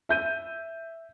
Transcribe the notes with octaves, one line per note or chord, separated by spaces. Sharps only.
E5 G6 D#7